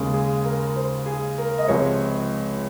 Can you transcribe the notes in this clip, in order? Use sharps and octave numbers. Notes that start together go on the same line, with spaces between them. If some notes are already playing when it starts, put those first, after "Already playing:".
Already playing: D#2 C#3 G#3
G#4
A#4
C5
G#4
A#4
D#5
C#2 C3 F3 G#3 C#5